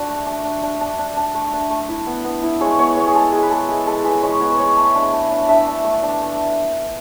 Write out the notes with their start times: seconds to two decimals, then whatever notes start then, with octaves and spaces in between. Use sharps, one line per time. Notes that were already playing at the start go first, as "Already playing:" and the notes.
Already playing: D4 F#4 D5
0.08 A3
0.26 D4
0.45 D4
0.63 D4
0.81 D4
0.99 D4
1.17 D4
1.34 A3
1.53 D4
1.70 A3
1.89 E4
2.07 B3
2.25 B3
2.43 E4
2.61 G#3 C#5
2.79 B3 C#5
2.96 B3 C#5
3.07 G#4
3.14 G#3 A4
3.33 G#3 G#4
3.42 B4
3.51 G#3 A4
3.69 E4 G#4
3.87 G#3 A4
4.05 G#3 B4
4.23 G#3 C#5
4.41 B3 C#5
4.50 B4
4.59 G#3 C#5
4.77 A3
4.95 D4
5.13 A3
5.31 D4
5.49 D4 E5
5.67 D4
5.84 A3
6.03 D4
6.21 A3